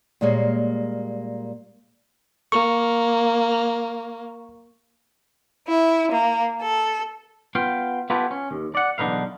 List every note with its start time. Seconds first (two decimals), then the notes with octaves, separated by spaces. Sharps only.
0.21 A#2 G3 G#3 A#3 C#5
2.52 A#3 C#6
5.68 E4
6.11 A#3
6.61 A4
7.55 B3 F4 F5 G5
8.10 B3 E4 F4 G4 A4 B4
8.31 C#4
8.51 D#2
8.75 D5 F#5
8.98 B1 E2 D3 D#4 B4 F5